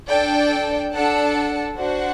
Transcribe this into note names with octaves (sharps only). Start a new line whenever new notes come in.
D4 A4 D5 G5
D4 A4 D5 F#5 A5
D4 F#4 C5 F#5